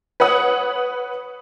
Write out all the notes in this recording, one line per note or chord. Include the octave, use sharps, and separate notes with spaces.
B4 C#5 F#5 D#6